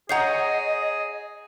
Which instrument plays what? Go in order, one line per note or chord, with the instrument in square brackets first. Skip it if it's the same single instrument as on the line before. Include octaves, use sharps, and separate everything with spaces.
[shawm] G#4 [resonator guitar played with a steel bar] C#5 F#5 [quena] D#5 [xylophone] A#5 G6 C7